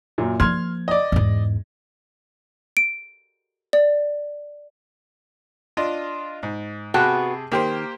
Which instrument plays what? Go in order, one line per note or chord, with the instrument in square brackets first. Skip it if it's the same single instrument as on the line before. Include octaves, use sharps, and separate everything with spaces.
[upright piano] F#2 A#2
[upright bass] F3 A#3 [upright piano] C6 F6 G#6
[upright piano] D5 D#5
[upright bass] E2 G#2
[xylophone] D7
D5
[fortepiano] D4 F4 D#5
G#2
[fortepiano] C3 G#4 A5 [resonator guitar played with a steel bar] B3 F#4 G5
[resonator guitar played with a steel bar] D#3 [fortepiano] A#3 G4 C5